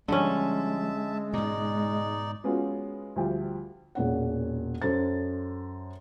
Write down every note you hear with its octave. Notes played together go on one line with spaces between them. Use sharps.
D3 F3 G3 G#3 C#4 E5 A5
G#2 B2 D#4 D5
G#3 B3 C#4 F4 F#4
D2 F3 G3 G5
E1 A#2 C#4 F#5
F#2 A4 C5 A6